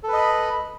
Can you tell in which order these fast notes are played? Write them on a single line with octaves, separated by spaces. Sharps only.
A4 B4 D#5 B5